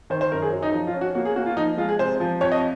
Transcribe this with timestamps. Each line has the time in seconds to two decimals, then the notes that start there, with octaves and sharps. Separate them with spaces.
0.10 D#3 C5
0.21 C5
0.32 F#2 A#4
0.42 G#4
0.52 F#3
0.62 D#4
0.73 F3 D#4
0.87 F4
0.94 C#4
1.01 F#4
1.15 A#3 F#4
1.25 G#4
1.36 A#3 F#4
1.46 F4
1.57 F3 D#4
1.77 G#3 F4
1.88 G#4
1.99 C3 C5
2.20 F3
2.41 F2 C#5
2.52 D#5